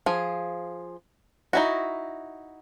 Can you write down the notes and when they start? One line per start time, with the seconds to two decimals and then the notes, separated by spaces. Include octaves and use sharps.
0.06 F3 G#4
1.53 D#4 E4 F#4